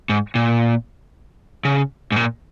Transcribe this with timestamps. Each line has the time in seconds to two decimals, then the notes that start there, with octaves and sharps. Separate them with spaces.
0.09 G#2
0.35 A#2
1.65 C#3
2.12 G#2
2.16 A#2